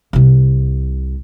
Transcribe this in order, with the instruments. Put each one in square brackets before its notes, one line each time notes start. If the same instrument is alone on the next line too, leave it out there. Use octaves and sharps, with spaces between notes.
[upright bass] C2 C3